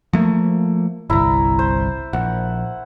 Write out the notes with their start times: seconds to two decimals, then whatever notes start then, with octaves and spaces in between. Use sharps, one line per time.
0.13 F3 A3 A#3
1.10 G1 C2 E4 A#5
1.59 C5
2.13 A#1 F#5